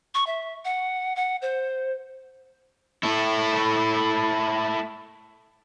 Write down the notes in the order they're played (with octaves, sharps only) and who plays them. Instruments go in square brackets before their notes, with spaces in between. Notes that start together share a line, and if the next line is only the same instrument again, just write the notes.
[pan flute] C#6
E5
F#5
F#5
C5
[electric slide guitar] A3 E4